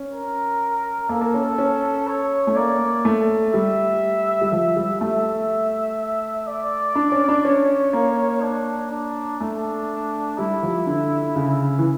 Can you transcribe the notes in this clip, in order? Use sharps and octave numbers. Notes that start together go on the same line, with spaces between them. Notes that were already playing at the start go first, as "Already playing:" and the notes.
Already playing: C#4
A#4
A#3 A4
A#3
C#4
C#4
C#5
A3
A#3 D5
A3
G3 E5
G3
F3 E5
G3
A3 E5
D5
D4
C#4
D4
C#4 C#5
A#3
D4
D4
A3 D4
G3 E4
F3
D3
C#3
E3